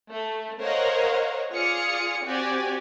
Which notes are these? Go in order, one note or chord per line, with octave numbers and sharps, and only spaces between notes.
A3
A#4 C5 C#5 D#5 F5 F#5
F4 G#4 D5 D#6 F6 C#7
C4 F#4 G4 D5 G#5